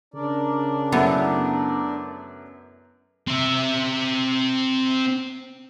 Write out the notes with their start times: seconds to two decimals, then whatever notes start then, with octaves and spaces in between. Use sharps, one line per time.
0.14 C#3 D4 A#4 D5
0.92 F#2 A3 B3 E4
3.28 C4 E5